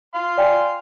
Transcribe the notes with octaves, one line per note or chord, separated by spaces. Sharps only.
F5 C6
D5 G5 G#5